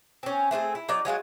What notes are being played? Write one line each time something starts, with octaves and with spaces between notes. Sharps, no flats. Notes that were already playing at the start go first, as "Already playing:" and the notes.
C4 C#4
A3 C4 F#4 G#4
E4
F#3 D#4 D5
F#3 G#3 F4 F#4